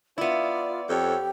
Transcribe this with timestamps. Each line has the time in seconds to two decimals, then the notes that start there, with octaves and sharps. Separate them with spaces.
0.18 B3 E4 F4 D5
0.89 F2 G4 A4 C#5